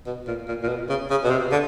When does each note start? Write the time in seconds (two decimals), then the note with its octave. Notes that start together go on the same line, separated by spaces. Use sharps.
0.06 B2
0.27 A#2
0.48 A#2
0.63 A#2
0.68 B2
0.89 C#3
1.10 C#3
1.24 B2
1.30 C3
1.51 D3